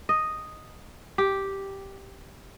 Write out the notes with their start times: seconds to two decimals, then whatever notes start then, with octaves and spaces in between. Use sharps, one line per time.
0.09 D#5
1.18 G4